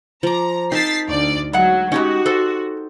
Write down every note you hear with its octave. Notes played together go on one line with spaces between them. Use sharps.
F3 A#5 D6
C4 D#4 A#4 A5 A6 B6 C7
D2 D5
F#3 G#3 F#5
G#3 C#4 D#4 F#4 G4
A4 C5